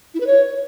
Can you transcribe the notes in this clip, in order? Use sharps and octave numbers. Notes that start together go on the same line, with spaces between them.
E4
B4
C#5